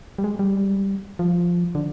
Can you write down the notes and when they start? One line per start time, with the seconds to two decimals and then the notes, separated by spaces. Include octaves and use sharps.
0.18 G3
0.24 G#3
0.39 G3
1.19 F3
1.75 D3